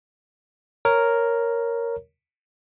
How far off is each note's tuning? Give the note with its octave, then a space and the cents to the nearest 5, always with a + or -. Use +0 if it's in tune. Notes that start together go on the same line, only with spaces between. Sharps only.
A#4 +0 C#5 +0